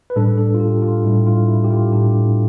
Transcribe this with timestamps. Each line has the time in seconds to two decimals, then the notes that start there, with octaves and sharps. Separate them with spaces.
0.10 B4
0.16 A2 G3 D4 A4
0.38 A4
0.54 F4
0.60 G4
0.82 F4
1.04 A2 G3 D4 E4
1.27 F4
1.48 E4
1.64 G4
1.70 F4
1.93 A2 G3 D4 G4